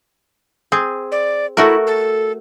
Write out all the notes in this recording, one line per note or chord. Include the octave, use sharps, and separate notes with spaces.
C4 G#4
D5
A3 E4 F#4 A#4
A4